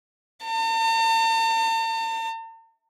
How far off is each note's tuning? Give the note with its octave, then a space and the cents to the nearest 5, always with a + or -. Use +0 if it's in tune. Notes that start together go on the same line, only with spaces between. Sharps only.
A5 +45